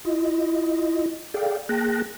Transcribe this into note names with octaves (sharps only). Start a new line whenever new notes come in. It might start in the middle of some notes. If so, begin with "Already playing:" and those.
E4 F4 D#5
G#4 A4 D5 F5 G5
A#3 G#4 G5 A5 F#6 A#6